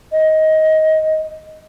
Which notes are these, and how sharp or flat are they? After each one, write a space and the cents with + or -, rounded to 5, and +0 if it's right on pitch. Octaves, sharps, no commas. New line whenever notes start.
D#5 +15